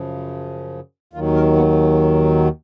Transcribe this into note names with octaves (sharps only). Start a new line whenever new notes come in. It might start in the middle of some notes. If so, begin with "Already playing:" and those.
Already playing: F#2 C#3 F3
D#2 D#3 F#3 F4
A#4
B3